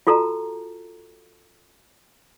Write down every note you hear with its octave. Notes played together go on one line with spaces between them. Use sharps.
F4 F#4 A4 A5 A#5